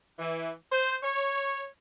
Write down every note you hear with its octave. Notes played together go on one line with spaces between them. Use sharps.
E3
C5
C#5